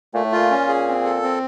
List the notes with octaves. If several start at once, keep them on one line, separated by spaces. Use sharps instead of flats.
A#2 A3
A2
A#2 F4
C#4
G#4
C4
A4
C4